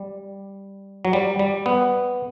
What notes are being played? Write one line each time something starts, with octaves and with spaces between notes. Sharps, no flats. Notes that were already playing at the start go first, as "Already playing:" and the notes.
Already playing: G3
F#3
G3
G3
B3